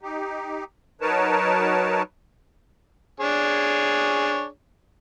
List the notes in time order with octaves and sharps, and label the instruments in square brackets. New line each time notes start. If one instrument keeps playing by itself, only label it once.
[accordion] D#4 G4
F#3 D#4 A#4 B4 C#5 A5
[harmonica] D4 G#4 C#5